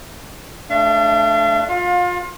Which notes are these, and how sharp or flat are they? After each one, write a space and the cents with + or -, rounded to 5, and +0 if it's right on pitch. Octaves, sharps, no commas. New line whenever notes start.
A3 -20 D4 +0 F5 -45
F4 +25 F5 +35